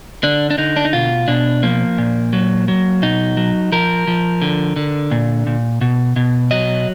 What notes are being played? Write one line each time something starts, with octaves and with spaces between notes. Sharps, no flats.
D3 D4
D4
D3 D#4
D4
D#4
B2 F4
B2 D4
F3 A#3
A#2
F#3
F#3
B2 D#4
F#3
F3 A#4
F3
D3
D3
A#2
A#2
B2
B2
F#3 D#5